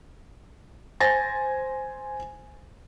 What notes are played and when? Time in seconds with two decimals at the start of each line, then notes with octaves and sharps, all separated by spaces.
1.00 C5 G#5 A6 A#6